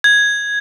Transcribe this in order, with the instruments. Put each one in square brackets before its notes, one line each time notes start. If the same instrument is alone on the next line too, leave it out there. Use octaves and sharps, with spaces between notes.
[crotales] G#6